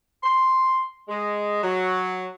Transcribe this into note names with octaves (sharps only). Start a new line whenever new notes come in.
C6
G#3
F#3